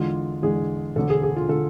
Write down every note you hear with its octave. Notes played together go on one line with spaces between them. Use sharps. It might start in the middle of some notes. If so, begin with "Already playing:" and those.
Already playing: E2 D3 G#3 F4
E2 D3 G#3 G#4
E1 D2 D3 A4
G#4
G#4
F4
D3 A4